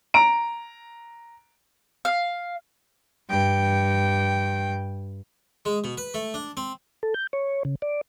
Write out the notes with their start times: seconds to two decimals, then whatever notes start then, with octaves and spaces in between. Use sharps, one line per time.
0.14 A#5 D7
2.05 F5
3.29 G2 G5
5.65 G#3
5.84 B2
5.97 B4
6.14 A3
6.34 D4
6.57 C4
7.03 A4
7.14 G6
7.33 C#5
7.65 C#3
7.82 D5